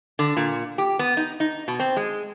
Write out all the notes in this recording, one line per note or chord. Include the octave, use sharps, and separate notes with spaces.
D3
A#2
G4
B3
D#4
D#4
B2
C4
G#3